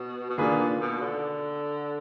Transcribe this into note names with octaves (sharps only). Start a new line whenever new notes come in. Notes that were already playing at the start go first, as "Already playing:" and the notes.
Already playing: B2
B2
A#2 D#3 A#3 D4 G#4 B4
A#2
B2
D3